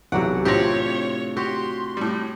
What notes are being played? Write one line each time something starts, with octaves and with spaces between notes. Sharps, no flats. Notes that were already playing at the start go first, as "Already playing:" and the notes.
B1 C3 E3 F#3 D5 F#5
A2 C4 D4 F4 G4 C#5 A#6
F#4 G4 C6
A2 G3